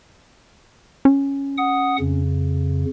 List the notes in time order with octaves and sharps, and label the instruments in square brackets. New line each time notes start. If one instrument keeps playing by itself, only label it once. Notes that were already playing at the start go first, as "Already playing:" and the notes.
[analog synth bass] C#4
[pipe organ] F#5 D#6
F2 C#3